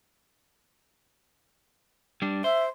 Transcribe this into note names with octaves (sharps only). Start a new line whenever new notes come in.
G3 D4
C5 E5